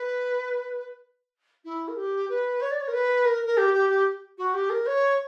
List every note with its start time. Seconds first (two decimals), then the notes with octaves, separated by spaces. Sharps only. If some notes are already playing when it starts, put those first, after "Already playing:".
Already playing: B4
1.64 E4
1.87 A#4
1.96 G4
2.29 B4
2.61 C#5
2.71 D5
2.80 C#5
2.87 A#4
2.93 B4
3.25 A#4
3.46 A#4
3.57 G4
3.73 G4
3.89 G4
4.37 F#4
4.53 G4
4.69 A#4
4.86 C#5